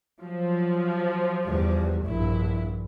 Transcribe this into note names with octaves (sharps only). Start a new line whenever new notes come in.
F3 F#3
E2 G3
A#1 G2 E4